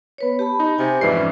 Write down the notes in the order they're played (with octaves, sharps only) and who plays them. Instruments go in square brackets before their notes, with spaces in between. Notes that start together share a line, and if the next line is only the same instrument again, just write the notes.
[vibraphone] B3 B4 C#5
G4 A5 B5
[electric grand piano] D#4
[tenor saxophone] C3 [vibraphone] G#5
[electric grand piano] F2 G#2 C7 [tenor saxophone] E3 [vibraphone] D5
[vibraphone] C#4